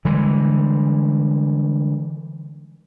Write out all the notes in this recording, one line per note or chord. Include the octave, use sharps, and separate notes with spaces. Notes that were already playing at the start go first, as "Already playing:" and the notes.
D3 E3 G3 G#3